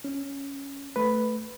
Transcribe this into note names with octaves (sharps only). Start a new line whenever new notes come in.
C#4
A3 B4